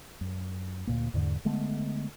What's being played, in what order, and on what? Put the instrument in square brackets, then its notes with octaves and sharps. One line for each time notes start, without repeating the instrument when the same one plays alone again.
[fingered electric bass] F#2
D2 A#2 A#3
E2 G#2 D3
D3 G#3 A3 B3